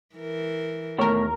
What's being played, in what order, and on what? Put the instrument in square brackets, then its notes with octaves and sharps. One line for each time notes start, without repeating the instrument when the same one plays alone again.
[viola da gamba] E3 A#4
[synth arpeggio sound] D#2 A#4 [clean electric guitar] B2 A3 C#5